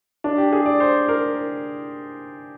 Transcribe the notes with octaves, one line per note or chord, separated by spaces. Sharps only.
D4
G4
G#4
D5
C5
A#4